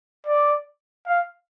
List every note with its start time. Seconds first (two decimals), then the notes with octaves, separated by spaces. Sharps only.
0.27 D5
1.07 F5